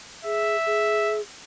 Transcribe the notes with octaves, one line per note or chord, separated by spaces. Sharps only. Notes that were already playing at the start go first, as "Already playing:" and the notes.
G#4 E5
G#4